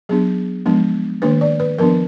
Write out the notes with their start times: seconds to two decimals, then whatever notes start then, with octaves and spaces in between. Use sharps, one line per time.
0.09 F#3 B3 D4 G#4
0.66 F3 G#3 B3 D4
1.22 D#3 A#3 D4 B4
1.41 D5
1.60 B4
1.79 F3 B3 D4 A#4